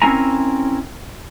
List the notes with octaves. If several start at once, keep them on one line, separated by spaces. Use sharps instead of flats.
C4 C#4 E4 A#4 G#5 A#5